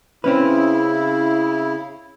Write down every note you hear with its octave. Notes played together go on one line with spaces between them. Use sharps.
C#3 C4 C#4 E4 B4